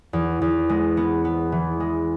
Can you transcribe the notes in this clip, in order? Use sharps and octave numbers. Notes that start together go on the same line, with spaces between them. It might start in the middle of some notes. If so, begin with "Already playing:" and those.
E2
E2
G#3
B3
B3
E3
G#3